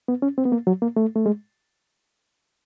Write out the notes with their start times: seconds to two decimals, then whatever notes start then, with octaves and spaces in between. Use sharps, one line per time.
0.08 B3
0.22 C#4
0.38 C4
0.45 B3
0.52 A#3
0.67 F#3
0.82 A#3
0.96 A3
1.16 A3
1.26 G#3